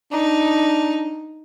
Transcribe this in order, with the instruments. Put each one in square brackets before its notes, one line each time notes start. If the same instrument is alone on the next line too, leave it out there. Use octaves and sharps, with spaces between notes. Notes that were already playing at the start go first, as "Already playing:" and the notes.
[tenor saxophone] D4 [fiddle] D#4